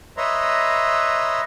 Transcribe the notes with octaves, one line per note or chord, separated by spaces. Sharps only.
B4 C#5 D#5 E5 A#5 C6